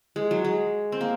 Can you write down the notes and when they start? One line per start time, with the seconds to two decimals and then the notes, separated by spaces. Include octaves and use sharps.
0.16 G#3
0.31 F#3
0.45 G#3
0.92 C4
1.01 A#3